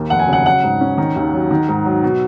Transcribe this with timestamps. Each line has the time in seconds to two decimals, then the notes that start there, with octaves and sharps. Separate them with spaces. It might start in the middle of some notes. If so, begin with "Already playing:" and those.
Already playing: D#2 A#3
0.10 F1 F#5
0.19 G#5
0.28 C#3 F#5
0.46 F#3 F#5
0.63 G#2
0.81 C#4
0.98 D#3
1.16 D#2
1.33 F#3
1.51 D#3
1.68 G#2
1.85 F#3
2.03 B2